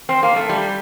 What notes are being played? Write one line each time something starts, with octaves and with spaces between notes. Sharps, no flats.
C4
A#3
A3
G3